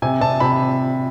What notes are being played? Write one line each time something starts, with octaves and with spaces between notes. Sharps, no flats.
C3 G#5
C3 A5
C3 B5